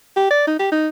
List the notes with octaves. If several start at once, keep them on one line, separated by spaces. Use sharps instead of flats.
G4
D5
D#4
G4
D#4